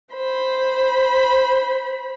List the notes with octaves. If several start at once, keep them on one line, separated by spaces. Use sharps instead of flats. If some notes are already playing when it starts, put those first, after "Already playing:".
C5 B5